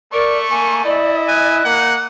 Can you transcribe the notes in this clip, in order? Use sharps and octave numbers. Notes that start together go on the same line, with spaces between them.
A3 A#4 D5 C#6
A#3 G#5
E4 D5 D#5
G#5 F#6
A#3 F#5